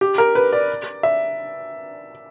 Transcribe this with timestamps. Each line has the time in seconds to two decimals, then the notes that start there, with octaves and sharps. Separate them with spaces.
0.01 G4
0.18 A#4
0.35 B4
0.52 D5
1.03 E5